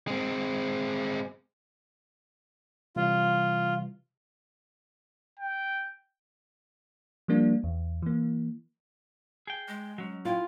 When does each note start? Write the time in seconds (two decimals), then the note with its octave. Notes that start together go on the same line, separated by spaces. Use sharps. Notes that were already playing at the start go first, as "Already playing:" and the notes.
0.08 G#3 C4
2.96 C3 E3 G3 F4
5.40 G5
7.28 F3 G3 A#3 D4
7.64 E2
8.02 E3 A#3
9.47 G#4 G5
9.68 G#3
9.98 F#3 C#4
10.25 E4 F4 F5 G5